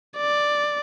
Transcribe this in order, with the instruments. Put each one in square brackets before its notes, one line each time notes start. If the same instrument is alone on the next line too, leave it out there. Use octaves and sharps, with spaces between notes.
[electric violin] D5